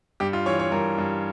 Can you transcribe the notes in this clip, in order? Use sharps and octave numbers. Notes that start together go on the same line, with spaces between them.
G2 G4
F4
E3 C#5
C#5
G2 A#4
G2